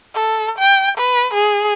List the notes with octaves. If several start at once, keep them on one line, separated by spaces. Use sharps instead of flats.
A4
G5
B4
G#4